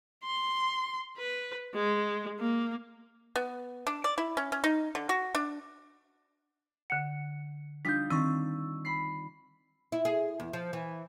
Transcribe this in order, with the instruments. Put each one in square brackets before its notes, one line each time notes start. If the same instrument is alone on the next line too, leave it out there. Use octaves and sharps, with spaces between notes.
[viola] C6
B4
G#3
A#3
[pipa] B3
D4
D5
E4
C#4
C#4
D#4
D3
F#4
D4
[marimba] D3 F#5 [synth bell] C#7
[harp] G3 D#4 F4 [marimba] D4 [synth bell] G6 B6
[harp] D#3 D4 [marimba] C4 [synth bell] C#6 E6
[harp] B5 C7
[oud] E4
G#4
E2
F3
E3